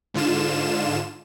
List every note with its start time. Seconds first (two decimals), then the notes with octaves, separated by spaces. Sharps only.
0.14 G#2 D3 F4 E7